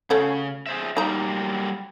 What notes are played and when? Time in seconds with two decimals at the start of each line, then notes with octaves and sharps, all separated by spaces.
0.10 C#3 A3 C#4 F#4
0.66 G#4 C5 E5
0.97 F#3 G3 A#3 D#4 A#5